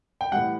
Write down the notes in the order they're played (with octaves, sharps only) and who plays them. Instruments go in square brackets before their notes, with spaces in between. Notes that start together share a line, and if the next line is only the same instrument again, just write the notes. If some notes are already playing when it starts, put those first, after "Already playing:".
[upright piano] G5
A2 E3 G3 F#5